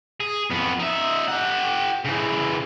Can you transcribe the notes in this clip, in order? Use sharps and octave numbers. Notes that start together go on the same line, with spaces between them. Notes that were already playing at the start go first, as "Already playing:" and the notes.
G#4
F2 B3
D#4 E5
G4 F#5
C#3 E3